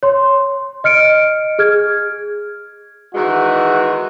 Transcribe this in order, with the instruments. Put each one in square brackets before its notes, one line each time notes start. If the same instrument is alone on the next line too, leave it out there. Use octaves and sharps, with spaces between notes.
[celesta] C#5 C6
D#5 F6 C#7 D7
G#4 F6 G#6
[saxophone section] D#3 E3 G#3 [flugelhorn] F#4